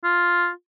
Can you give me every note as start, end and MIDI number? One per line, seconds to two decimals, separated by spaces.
0.04 0.50 65